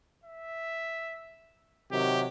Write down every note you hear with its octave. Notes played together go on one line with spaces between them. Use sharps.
E5
C3 D#3 F#3 G4